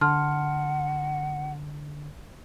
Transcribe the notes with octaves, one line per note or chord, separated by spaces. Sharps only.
D3 F#5 A5 C6 F6